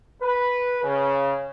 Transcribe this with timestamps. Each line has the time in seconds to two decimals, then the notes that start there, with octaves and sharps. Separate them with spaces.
0.22 B4
0.83 C#3